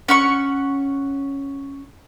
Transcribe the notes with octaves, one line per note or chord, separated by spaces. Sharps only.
C#4 F#5 C#6